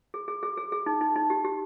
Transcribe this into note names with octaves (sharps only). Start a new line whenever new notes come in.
G#4
G#4
G#4
G#4
G#4
D#4
D#4
D#4
G4
G4